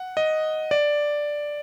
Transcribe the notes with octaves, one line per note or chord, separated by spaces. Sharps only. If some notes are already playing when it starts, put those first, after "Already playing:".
Already playing: F#5
D#5
D5